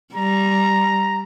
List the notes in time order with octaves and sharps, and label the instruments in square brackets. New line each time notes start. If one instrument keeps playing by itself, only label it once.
[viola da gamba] G3 [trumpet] A#5